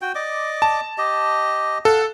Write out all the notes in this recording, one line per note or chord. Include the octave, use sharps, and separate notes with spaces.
F#4 G5
D5 D#5 D6
A5
G4 D#5
A4 F5 F#5